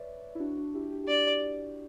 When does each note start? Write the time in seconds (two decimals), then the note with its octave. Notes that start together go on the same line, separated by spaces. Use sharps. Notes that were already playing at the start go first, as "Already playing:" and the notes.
Already playing: B4 C#5 D5 E5
0.35 E4
0.40 D4 F#4
0.57 D4 F#4
0.74 E4 G4
0.92 E4 G4
1.04 G4
1.08 D4 F#4 D5